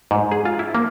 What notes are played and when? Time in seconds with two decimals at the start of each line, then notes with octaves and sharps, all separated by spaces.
0.11 G#2
0.32 G#4
0.45 F4
0.59 E4
0.75 A#3